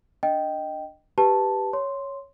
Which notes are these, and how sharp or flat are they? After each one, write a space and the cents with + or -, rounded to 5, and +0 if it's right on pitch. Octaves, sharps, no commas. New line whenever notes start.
D4 +0 D#5 +0 G5 -5
G4 +0 B4 +0 A5 +0
C#5 +0 C6 +0